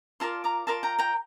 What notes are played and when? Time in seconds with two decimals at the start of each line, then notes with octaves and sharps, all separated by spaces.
0.20 F4 A#4 D5 A5 C6
0.44 A#5 D6
0.67 F4 A#4 D5 A5 C6
0.83 G5 A#5
0.99 G5 A#5